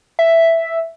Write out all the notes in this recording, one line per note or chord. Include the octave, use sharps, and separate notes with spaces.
E5